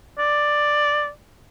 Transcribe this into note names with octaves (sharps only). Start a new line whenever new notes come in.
D5